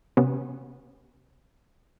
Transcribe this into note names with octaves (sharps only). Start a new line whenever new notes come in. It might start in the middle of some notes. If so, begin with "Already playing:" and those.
C3 B3 C#4